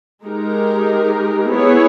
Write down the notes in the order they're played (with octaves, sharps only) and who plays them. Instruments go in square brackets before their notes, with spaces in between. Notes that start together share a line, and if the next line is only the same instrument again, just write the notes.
[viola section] G#3 D#4 G4 A#4
B3 E4 G#4 C#5